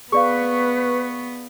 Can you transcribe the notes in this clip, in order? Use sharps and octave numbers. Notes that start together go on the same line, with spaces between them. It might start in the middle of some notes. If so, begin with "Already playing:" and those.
B3 G#4 B4 D5 F5 C#6